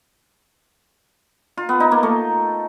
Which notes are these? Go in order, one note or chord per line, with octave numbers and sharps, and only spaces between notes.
F4
B3
D#4
A#3
A3